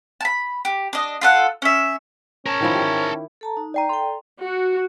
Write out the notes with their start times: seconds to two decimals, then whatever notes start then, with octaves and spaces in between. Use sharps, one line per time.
0.21 A5 B5
0.65 G4
0.93 D4 D#5
1.21 F4 A4 F#5
1.62 C#4 E5
2.46 C#4 A#4 A5
2.61 D#3 F3 E4
2.74 G4
3.41 A4 A5 A#5
3.57 D#4
3.74 D5 G5 A#5
3.89 A4 G5 C6
4.40 F#4